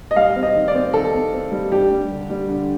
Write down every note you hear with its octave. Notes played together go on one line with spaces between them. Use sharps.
D#5
G3 F5
C4
D#5
D#3
D5
C4
D#3 A4
C4
C4
G3
D4 G4
G3
D3
G3
D3